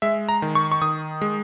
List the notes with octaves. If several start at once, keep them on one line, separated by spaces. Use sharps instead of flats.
G#3 E5
A#5
D#3
C#6
C#6
D#3 D#6
G#3